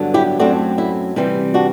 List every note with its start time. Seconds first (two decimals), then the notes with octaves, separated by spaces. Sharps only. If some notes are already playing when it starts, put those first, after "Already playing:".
Already playing: G2 D3 F#3 B3
0.14 E4 G4
0.39 F#2 F#3 A3 C4 D4 F#4
0.78 E4
1.16 C3 E3 G3 C4 E4
1.54 D4 F#4